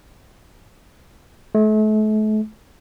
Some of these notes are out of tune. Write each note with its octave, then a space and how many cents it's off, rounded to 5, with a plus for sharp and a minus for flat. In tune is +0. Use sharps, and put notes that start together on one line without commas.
A3 -40